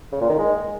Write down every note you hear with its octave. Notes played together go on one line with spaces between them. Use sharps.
C#3
A#2
D#3
G#3